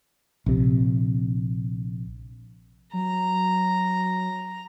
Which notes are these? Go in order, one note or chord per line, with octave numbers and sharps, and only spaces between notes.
A#1 C3
F#3 A#5